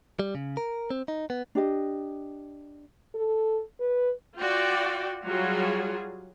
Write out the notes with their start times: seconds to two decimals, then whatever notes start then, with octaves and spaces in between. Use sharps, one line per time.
0.19 G3
0.35 C#3
0.57 A#4
0.90 C4
1.08 D#4
1.30 B3
1.55 D4 G4 D#5
3.15 A4
3.80 B4
4.38 F4 F#4 D5 G5
5.24 F#3 G3 F4 F#4 G#4